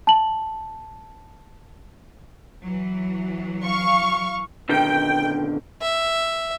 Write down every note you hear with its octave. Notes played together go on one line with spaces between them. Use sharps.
A5 F#7
E3 F#3
F5 C#6
B2 D3 D#3 G5
E5